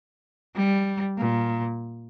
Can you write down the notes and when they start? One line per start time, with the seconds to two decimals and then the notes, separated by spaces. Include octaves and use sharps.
0.56 G3
1.18 A#2